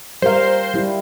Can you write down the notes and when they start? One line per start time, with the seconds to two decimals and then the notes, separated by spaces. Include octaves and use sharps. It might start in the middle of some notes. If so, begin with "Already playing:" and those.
0.22 G3 A#4 C5 F5
0.74 G3 E4